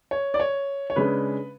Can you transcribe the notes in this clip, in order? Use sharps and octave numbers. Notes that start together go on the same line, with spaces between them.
C#5
D5
C#5
C#5
C#3 G#3 D4 B4